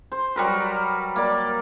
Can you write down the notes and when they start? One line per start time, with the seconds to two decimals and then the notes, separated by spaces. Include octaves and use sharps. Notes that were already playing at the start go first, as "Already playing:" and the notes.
0.12 C5
0.36 F#3 G3 A#4 B4
1.16 A#3 D5